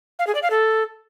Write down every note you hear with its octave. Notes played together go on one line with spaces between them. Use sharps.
F5
G#4
D5
F5
A4